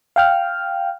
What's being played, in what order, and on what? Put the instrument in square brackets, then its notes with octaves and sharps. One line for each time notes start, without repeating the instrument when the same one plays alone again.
[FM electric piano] F5 G5 F6